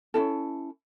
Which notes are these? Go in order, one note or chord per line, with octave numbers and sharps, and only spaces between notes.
C#4 D4 E4 A4